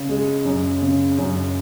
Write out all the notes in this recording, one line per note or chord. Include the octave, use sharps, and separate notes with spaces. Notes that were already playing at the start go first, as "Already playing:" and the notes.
Already playing: C#3
G#3
F#2
C#3
F#2